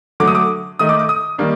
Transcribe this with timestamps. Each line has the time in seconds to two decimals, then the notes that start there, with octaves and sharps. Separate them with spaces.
0.20 D3 F#3 A3 D6
0.27 D#6
0.35 D6
0.79 D#3 A3 D#4 D#6
0.89 D6
0.99 D6
1.09 D#6
1.38 D#3 G3 A#3 D4